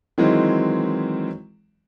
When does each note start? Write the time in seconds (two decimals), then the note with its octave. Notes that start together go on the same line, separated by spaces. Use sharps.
0.18 D#3 E3 F#3 G#3 C4 E4